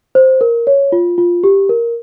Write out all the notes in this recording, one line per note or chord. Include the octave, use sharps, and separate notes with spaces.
C5
A#4
C#5
F4
F4
G4
A#4